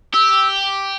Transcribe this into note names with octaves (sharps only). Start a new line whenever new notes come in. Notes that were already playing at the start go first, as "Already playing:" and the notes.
G4 E6